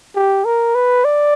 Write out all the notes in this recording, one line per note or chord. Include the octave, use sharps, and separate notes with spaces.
G4
A#4
B4
D5